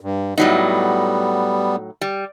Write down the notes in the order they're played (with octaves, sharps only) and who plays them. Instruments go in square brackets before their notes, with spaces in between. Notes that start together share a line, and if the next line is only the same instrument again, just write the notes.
[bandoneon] G2
[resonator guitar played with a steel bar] A2 F#3 D#4 [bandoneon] G3 B3
[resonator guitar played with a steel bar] G3